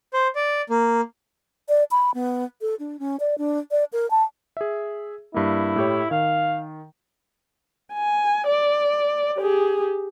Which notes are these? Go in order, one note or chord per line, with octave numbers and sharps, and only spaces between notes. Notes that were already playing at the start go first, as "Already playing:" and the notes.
C5
D5
A#3
D5
B5
B3
A4
D4
C#4
D5
D4
D5
A#4
A5
G#4 E5
G2 A#3 E4
A2 G4 C#5
D#3 F5
G#5
D5
G4 G#4